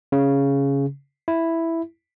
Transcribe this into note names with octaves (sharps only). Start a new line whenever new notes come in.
C#3
E4